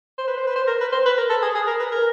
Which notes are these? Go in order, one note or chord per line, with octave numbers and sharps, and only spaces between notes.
C5
B4
C5
B4
C5
A#4
B4
C5
B4
A#4
A4
G#4
G#4
A#4
B4
A#4